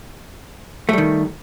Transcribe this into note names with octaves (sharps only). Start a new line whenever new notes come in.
D#3 G3 A3